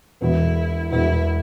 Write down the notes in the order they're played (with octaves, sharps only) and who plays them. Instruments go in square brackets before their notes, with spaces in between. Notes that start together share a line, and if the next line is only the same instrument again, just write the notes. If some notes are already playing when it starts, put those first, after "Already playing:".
[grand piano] E1 E2 B2 B3 [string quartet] E4
[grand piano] E1 E2 B2 B3 [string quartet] E4